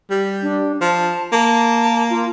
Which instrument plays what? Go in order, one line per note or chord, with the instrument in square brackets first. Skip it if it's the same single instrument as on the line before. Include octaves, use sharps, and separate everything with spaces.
[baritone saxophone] G3
[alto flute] D4
[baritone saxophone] F3 [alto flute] A5
[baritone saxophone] A#3 [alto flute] A5
[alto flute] F4